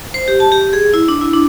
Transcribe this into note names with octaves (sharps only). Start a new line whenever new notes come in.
C5
G4
A5
G4
G#4
E4
D4
E4
D4